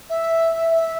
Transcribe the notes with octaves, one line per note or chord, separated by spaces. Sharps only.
E5
E5